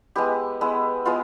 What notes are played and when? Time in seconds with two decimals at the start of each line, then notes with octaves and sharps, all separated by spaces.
0.15 G#3 B3 E4 G4
0.61 G#3 B3 E4
1.05 G#3 B3 E4 F4